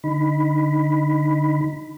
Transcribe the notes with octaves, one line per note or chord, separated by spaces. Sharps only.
D3 D#4 B5